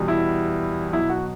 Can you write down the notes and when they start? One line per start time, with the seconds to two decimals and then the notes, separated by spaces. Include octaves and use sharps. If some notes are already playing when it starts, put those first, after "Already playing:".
Already playing: E2 B2 G3
0.08 E4
0.93 B2 F#3 E4
1.10 F#4